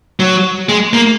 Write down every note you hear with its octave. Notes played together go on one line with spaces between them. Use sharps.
F#3
G#3
A#3